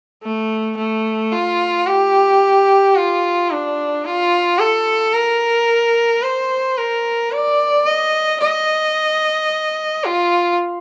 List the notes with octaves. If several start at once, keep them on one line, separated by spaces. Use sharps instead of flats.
A3
A3
F4
G4
F4
D4
F4
A4
A#4
C5
A#4
D5
D#5
D#5
F4